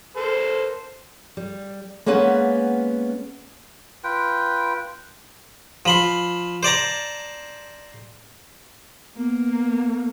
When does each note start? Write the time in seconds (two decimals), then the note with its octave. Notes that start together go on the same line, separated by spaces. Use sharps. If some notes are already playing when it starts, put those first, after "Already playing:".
0.17 A4 A#4 C5
1.37 G3
2.06 G#3 A#3 B3 C#4 B4 F#5
4.04 F4 B4 G5
5.86 F3 B5 C6
6.63 C5 D5 A5 A#5
9.17 A#3 B3